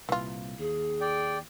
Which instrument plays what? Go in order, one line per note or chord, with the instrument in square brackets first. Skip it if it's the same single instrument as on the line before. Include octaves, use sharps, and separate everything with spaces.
[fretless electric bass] C2 A#2 [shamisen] E3 F4
[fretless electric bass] D#2 [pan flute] G#4
[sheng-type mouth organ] D5 G5